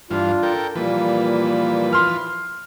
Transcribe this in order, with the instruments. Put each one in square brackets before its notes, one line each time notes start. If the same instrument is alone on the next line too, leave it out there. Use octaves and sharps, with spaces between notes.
[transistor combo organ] G2 E3 F5 [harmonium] D4 F4
[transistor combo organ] A4 A#4 G5
[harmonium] A#2 G3 A#3 [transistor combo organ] E3 F3 B4
[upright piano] C6 F6